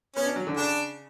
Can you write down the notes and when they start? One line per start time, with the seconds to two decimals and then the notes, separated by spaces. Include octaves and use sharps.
0.16 B3 C#4
0.26 D4
0.36 F#3
0.47 D3
0.56 C#3 D4